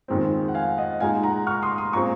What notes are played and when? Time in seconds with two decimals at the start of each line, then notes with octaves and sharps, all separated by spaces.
0.08 F2 D#3 G#3 C4
0.48 F#5
0.54 F5 G#5
0.77 D#5 F#5
1.00 A#2 G#3 D#4 F5 G#5
1.23 F#5 A#5
1.47 C#6 F6
1.62 C6 D#6
1.78 C6 D#6
1.93 A#2 G#3 C4 A#5 C#6